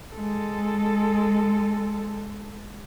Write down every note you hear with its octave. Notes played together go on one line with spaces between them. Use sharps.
G#3 A4